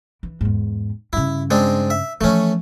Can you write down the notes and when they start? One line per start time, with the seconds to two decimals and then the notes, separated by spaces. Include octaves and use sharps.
0.23 E3
0.41 E2 G#2
1.13 G2 C#3 E4
1.51 G#3 C4 D4
1.90 E5
2.21 E3 F3 A3 C#4